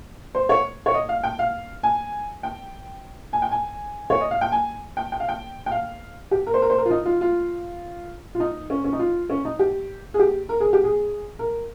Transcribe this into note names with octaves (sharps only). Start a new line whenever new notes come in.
C5
C#5
C#5
D#5
F5
G5
F5
G#5
G5
G#5
G5
G#5
C#5
D#5
F5
G5
G#5
G5
G5
F5
G5
G5
F5
G4
A#4
C5
A#4
C5
A#4
F4
D#4
F4
F4
F4
D#4
C#4
C#4
D#4
F4
C#4
D#4
G4
G#4
G4
A#4
G#4
G4
G#4
A#4